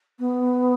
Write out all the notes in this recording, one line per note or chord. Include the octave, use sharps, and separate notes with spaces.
B3